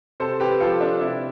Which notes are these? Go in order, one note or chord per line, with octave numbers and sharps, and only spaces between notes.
C3 A4 C5
G4 B4
F3 F4 A4
D4
C3 E4